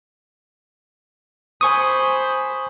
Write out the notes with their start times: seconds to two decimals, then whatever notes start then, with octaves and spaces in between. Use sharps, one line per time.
1.61 C5 G#5 B5 C#6 D#6